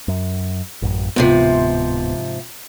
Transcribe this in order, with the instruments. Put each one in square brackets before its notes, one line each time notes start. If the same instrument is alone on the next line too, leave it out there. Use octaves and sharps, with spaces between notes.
[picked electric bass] F#2
A1 F#2
[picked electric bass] D1 B3 [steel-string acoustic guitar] G#2 C3 F3